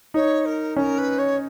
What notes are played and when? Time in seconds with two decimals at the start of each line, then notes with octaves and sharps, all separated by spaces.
0.14 D#4 C#5
0.46 A#4
0.76 C#4 A#4
0.98 B4
1.18 C#5